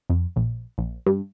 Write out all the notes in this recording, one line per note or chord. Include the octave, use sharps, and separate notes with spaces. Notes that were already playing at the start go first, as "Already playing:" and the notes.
F2
A#1
A#1
G2